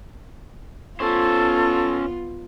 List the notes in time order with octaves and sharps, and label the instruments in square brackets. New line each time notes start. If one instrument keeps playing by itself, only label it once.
[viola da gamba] B3 F4 [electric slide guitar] C#4 C5 [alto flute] A4